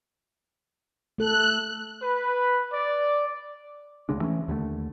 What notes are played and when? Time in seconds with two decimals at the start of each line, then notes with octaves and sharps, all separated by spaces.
1.18 A3 A4 F#6
2.01 B4
2.73 D5
4.09 D2 C#3 G#3 D4
4.21 E3 A3 A#3 C#4
4.48 D#2 D3 D#3 A3